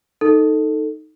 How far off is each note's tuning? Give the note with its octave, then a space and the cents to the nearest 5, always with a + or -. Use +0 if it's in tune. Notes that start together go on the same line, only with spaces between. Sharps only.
D#4 +0 A4 +5